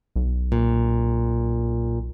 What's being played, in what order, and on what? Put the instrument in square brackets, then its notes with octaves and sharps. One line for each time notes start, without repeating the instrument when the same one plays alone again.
[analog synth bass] B1
[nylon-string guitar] A#2